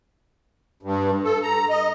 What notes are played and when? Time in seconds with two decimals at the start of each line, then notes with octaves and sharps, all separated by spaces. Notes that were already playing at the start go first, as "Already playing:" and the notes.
0.83 G2
1.24 A4
1.43 A#5
1.69 D#5